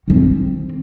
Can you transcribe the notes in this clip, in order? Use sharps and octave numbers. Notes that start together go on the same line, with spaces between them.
D#3 C4